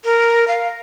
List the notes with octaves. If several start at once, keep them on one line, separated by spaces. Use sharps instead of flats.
A#4
F5